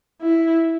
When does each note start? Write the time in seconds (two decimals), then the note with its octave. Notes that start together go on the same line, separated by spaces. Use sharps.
0.22 E4